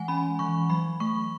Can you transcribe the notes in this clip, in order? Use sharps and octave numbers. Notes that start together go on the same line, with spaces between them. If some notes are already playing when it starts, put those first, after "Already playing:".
Already playing: E3 G#3 F#5 G#5
C#4 B5
E3 C#6
F#3 B5
A3 C#6